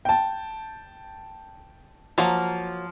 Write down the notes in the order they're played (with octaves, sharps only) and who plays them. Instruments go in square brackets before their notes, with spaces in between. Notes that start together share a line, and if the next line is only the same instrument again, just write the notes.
[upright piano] G5 A5
[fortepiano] F3 [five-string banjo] F#3 A#3